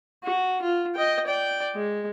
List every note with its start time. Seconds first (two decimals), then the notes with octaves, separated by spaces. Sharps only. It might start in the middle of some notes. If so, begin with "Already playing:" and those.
0.24 F#4
0.62 F4
0.95 D#5 G5
1.28 D5 G5
1.75 G#3